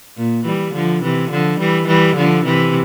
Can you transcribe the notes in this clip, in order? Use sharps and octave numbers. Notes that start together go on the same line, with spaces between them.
A#2
E3 G3
D3 F3
C3 E3
D3 F3
E3 G3
E3 G3
D3 F3
C3 E3